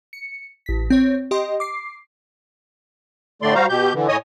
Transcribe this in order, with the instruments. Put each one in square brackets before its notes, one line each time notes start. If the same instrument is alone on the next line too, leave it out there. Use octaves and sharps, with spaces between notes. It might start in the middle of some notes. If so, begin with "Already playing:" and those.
[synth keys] C#7
A1 B6
C4 C#5
G4 D#5 G5 C6
D6 C7
[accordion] A2 D3 A3 D5 C6
G3 F#4 C5 F5 A#5
B2 G4 G6
D3 E3
A2 C#5 D#5 G#5 D#6